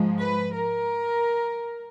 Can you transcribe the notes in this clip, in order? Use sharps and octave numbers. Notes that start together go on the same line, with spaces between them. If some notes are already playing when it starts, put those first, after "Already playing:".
Already playing: G#2 F3 G#3
B4
A#4